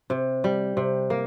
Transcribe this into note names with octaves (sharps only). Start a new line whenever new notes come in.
C3
G3
C3
A#3